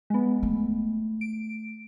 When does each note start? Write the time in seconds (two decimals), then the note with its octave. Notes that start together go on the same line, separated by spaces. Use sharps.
0.10 G#3 B3
0.43 A3
1.21 D7